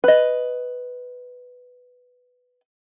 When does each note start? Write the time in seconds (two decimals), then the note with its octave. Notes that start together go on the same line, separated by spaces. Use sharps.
0.04 B4 D#5